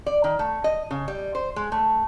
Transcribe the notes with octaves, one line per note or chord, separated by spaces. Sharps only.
D5
D#3
A3
D#5
C#3
G3
C5
G#3
A3